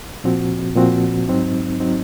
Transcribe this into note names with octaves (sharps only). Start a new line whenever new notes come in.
A#2 F3 C4 F#4
A#2 F3 C4 F#4
G#2 F#3 C4 D#4
F#3 C4 D#4